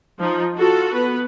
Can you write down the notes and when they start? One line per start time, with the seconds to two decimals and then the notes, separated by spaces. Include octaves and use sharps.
0.19 F3 D#4
0.55 F4 F#4 A4
0.93 B3 B4